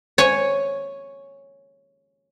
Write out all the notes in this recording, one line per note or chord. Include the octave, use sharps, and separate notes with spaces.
C#5 G#5